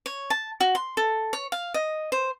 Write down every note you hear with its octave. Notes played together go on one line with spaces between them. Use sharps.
C#5
A5
F#4
C6
A4
C#5
F5
D#5
C5